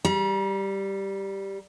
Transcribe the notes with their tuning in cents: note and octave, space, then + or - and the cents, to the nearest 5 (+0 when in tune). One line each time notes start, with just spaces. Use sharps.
G3 +0 A#5 +45